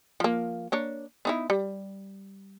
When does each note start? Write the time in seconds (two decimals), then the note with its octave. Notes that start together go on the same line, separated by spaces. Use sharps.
0.20 F3 A#3
0.72 A#3 D4 C#5
1.25 B3 D#4 E4
1.50 G3